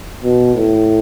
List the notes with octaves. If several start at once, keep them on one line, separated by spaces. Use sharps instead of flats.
B2
A2